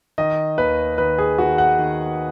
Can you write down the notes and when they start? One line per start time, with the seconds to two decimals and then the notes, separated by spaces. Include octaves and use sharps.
0.18 D#3 D#5
0.58 D#2 B4
0.98 D#3 B4
1.18 G#4
1.38 D#3 F#4
1.58 F#5
1.79 D#3